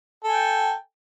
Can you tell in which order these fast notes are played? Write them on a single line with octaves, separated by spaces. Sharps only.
A4 G#5 G5